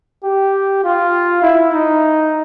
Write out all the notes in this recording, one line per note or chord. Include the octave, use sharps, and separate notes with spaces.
G4
F4
E4
D#4